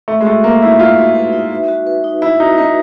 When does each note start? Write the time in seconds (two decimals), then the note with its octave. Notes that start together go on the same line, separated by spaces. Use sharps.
0.08 A3 E5
0.20 G#3
0.25 A3 F#4
0.44 A#3 B4
0.61 D#4 E4
0.79 F4 E5
0.97 F#4
1.15 B4
1.33 D#4
1.51 E5
1.68 F#4
1.87 B4
2.04 D#4
2.22 E4 E5
2.40 D#4 F#4
2.58 D#4 B4